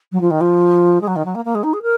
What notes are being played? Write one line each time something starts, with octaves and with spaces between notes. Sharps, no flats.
F#3
F3
D#3
F3
G#3
F#3
D#3
F#3
A#3
A#3
G#3
D#4
G#4
A#4